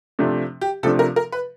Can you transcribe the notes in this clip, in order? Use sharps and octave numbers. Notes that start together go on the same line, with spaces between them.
C3 F3 A3 D4
G4
C3 F3 A3 D4 A4
A#4
A#4
B4